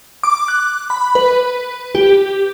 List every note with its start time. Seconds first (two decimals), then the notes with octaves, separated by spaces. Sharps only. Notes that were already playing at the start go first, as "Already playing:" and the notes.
0.23 D6
0.48 F#6
0.90 B5
1.15 B4
1.95 G4